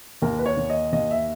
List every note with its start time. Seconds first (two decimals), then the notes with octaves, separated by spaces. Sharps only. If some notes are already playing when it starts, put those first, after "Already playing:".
0.22 D#2 A#4
0.39 B4
0.46 C#5
0.57 D#2
0.70 D#5
0.92 D#2 D#5
1.11 E5